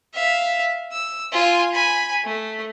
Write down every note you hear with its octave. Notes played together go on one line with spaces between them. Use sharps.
E5 F5
E6
F4 G#5
G#5 B5
A3